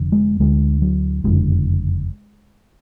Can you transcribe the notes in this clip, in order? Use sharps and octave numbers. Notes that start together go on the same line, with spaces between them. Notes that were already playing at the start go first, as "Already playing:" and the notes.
Already playing: F1 F2 D3
G#3
D2 D3 G#3
F#3
F#1 F2 D3 G#3